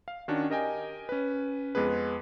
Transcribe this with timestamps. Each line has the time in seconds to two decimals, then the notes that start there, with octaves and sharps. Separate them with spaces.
0.08 F5
0.28 D#3 C#4 D4 F#4
0.49 G4 A#4 D#5 G5 G#5
1.09 C#4 B4
1.75 F2 G#3 B3 G#4 B4